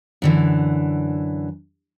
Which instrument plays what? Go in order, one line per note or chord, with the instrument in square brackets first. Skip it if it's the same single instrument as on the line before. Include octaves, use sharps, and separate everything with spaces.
[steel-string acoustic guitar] F#2 D3 E3